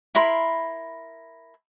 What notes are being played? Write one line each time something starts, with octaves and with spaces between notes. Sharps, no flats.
E4 A#4 B5 C6